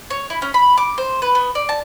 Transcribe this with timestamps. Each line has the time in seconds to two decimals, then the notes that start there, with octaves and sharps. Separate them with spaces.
0.10 C#5
0.30 E4
0.42 C#4
0.54 B5
0.77 D6
0.98 C5
1.22 B4
1.35 B3
1.55 D5
1.69 A5